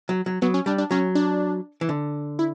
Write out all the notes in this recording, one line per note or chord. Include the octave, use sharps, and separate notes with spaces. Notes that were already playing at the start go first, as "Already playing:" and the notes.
F#3
F#3
F#3 B3
C#4
G3 D4
D4
F#3 C#4
D4
E3
D3
E4